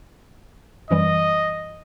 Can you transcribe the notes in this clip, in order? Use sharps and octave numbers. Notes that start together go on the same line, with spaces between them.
F#2 E3 G3 D#5